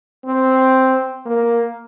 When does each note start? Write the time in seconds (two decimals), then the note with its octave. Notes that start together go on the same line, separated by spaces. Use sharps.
0.25 C4
1.25 A#3